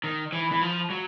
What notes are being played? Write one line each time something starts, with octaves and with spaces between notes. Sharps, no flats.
D#3
E3
E3
F3
F#3